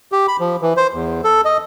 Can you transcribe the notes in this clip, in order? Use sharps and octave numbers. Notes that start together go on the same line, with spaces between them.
G4
B5
F3
E3
C5
E2
A4
D#5